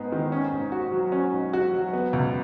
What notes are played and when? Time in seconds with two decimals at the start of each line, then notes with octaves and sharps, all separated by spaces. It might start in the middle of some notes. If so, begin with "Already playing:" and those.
Already playing: G#2 G#3 B3
0.12 D#3
0.32 C#4
0.52 G#2
0.72 F#4
0.92 F#3
1.12 C#4
1.33 G#2
1.53 F#4
1.74 F#3
1.93 B3
2.13 C#2